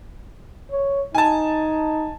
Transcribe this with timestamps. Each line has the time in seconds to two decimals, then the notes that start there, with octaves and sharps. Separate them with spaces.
0.71 C#5
1.15 D#4 G#5 A5